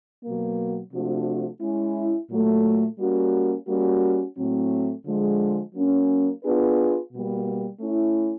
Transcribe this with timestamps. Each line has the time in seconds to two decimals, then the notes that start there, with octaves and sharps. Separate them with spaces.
0.24 B2 F#3 A#3
0.92 C3 F3 A3 D4 F#4
1.61 G#3 C#4 E4
2.30 A#2 F#3 A3
2.99 G3 A#3 C#4 F#4
3.68 G3 A#3 C#4 F#4
4.36 A2 F#3 A3 C4
5.05 D3 F3 G#3
5.74 F#3 A#3 C#4
6.44 B3 D4 F4 G#4 B4
7.12 B2 G3 A#3
7.81 A3 C#4 E4